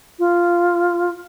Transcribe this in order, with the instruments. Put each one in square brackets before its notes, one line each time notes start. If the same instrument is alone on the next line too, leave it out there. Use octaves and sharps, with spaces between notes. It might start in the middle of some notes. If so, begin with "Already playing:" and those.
[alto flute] F4